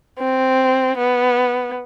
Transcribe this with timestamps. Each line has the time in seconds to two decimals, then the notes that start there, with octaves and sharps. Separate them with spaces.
0.19 C4
0.98 B3